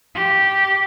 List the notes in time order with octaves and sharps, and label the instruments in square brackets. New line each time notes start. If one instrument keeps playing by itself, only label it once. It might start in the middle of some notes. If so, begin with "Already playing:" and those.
[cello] G4